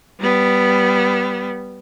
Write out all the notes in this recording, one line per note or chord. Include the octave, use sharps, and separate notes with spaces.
G3 B3